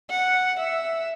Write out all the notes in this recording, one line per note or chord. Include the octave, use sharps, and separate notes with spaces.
F#5
E5